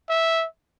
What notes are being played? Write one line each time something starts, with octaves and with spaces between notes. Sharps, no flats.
E5